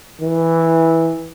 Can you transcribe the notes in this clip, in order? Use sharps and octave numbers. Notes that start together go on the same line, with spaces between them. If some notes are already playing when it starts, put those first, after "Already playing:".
E3